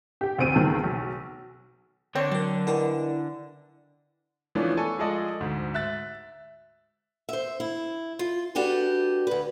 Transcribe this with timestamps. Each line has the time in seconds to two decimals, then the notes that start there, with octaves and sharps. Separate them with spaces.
0.21 G4 G5
0.38 A1 D2 C4 D7 D#7
0.54 C#2 D#3 A5 E6
0.84 B1
2.15 D3 C4 C#5 G6
2.31 F#3 C4 A#4
2.67 B2 E3 G3 E4 A#4
4.55 E3 F3 A3 B3 C#4 D4
4.77 A4 G#5 C#6
4.98 F3 G#3 G#4 A4 D5 D#5
5.40 D2 G#2
5.74 E5 F#6 A6
7.29 C5 E5
7.60 E4
8.19 F4
8.55 D4 F#4 G4 A4 B4
9.27 D2 B4